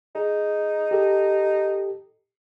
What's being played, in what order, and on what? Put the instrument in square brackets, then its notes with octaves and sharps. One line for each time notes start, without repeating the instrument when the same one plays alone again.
[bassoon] D#4 [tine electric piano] G#4
[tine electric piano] G4 A4